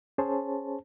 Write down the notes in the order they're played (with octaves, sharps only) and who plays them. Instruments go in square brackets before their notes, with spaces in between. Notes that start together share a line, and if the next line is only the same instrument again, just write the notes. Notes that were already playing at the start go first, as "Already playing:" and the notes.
[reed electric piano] C#4 G#4 C5 C#5 A5